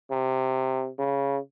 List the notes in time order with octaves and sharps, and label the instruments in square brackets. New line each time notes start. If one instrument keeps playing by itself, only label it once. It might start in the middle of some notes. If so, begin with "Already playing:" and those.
[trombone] C3
C#3